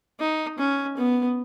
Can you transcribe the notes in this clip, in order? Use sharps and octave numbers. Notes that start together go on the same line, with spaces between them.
D#4
C#4
B3